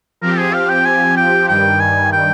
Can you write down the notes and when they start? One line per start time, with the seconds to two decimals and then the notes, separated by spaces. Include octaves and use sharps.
0.21 F3 C4 G4 A#4
0.38 G#4
0.53 F5
0.69 G5
0.85 G#5
1.17 G5
1.48 G2 D#3 G3 G5
1.80 G#5
2.12 G5